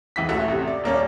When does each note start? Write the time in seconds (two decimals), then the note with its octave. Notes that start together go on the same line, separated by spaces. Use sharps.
0.16 C#2 E3 E4 B6
0.29 A1 A3 F#4 E5
0.48 A1 C3
0.67 D5
0.84 D#1 A#3 C#4 D5